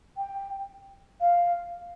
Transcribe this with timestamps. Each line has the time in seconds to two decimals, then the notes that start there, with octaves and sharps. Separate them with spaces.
0.17 G5
1.21 F5